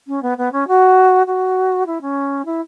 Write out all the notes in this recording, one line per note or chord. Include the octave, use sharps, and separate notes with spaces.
C#4
B3
B3
C#4
F#4
F#4
E4
C#4
E4